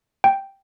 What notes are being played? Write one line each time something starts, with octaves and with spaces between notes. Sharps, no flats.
G5